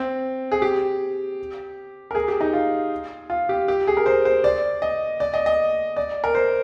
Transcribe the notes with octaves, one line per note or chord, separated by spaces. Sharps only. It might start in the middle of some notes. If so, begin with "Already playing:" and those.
Already playing: C4
G#4
G4
A#4
G#4
G4
D#4
F4
F4
G4
G4
G#4
A#4
C5
C5
D5
D#5
D5
D#5
D#5
D5
A#4
C5